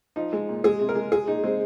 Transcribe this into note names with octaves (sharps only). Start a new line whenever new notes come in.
F3 D#4
G#3
A#2
G#3 G#4
C3
A#4
G#3
G#3 G#4
A#2 D#4
G#3 C4